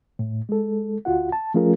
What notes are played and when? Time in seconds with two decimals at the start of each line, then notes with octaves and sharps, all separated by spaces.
0.19 A2
0.49 G#3 A4
1.05 D2 F4 F#4 F#5
1.32 A5
1.54 F3 A3 C#4 F4 G#4 A#4